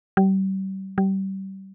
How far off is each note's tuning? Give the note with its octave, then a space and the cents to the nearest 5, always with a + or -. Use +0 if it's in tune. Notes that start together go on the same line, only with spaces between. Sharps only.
G3 -35
G3 -30